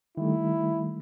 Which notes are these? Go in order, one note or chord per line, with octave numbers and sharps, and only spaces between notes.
D#3 G3 A3 E4